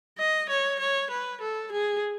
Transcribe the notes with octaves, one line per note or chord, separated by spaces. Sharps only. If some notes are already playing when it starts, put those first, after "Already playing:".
D#5
C#5
C#5
B4
A4
G#4